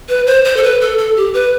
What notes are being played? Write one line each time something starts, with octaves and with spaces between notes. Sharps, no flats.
B4
C5
C5
A4
B4
A4
A4
G4
B4